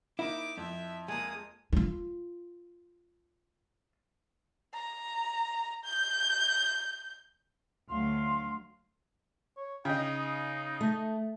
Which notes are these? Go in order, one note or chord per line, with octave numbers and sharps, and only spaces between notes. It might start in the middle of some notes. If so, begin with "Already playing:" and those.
A#3 D#4 E4 D6
F2 E5
G#3 A#3 D#6
E4 F4
A#5
G6
D2 F#3 F5 C6
C#5
C#3 D#5 G5
D#4
A3